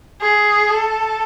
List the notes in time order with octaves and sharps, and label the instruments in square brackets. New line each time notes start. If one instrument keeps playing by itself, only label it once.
[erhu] G#4
A4